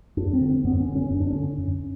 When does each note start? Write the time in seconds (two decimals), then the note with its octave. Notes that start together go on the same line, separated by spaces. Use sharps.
0.17 F#2 D4
0.33 C4
0.40 D3
0.49 C4
0.64 F#2 B3
0.80 C#4
0.88 D3
0.95 C#4
1.11 F#2 C#4
1.20 D4
1.30 D3 C#4
1.58 F#2